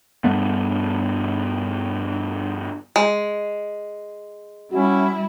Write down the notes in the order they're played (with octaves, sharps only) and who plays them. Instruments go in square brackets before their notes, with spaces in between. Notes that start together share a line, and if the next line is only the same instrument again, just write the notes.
[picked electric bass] G2 G3 A3 B3
[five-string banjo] G#3
[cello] G3 E4 [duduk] C#4 [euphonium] F#4